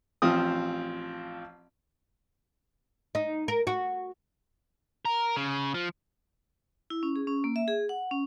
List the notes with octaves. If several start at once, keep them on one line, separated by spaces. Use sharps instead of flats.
A1 F3 C4 F5 D#6
D#4
A#4
F#4
A#4
C#3
F3
E4
C#4
G#4
C#4
A#3
E5
G#4
F#5
C#4